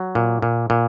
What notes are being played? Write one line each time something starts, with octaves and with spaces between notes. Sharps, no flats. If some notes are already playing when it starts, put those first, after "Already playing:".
Already playing: F#3
A#2
A#2
A#2